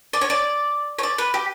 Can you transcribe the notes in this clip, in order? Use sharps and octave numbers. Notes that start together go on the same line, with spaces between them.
D5
C#5
D5
C#5
D5
B4
G4